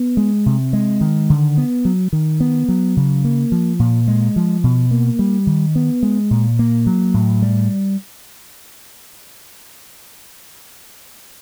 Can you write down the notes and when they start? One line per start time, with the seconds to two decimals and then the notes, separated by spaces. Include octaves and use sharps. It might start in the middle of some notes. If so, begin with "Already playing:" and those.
Already playing: B3
0.17 G#3
0.46 C3
0.73 G#3
1.01 D#3
1.30 D3
1.58 B3
1.85 F#3
2.13 D#3
2.40 B3
2.69 F#3
2.97 C#3
3.24 A#3
3.52 F3
3.79 A#2
4.08 G#3
4.36 F3
4.64 B2
4.91 A#3
5.19 G3
5.47 D#3
5.75 B3
6.03 G#3
6.31 A#2
6.59 A#3
6.86 F#3
7.14 A2
7.42 G3